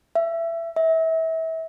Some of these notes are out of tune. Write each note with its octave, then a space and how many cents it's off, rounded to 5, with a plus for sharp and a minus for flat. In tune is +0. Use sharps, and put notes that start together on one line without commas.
E5 +20
E5 -30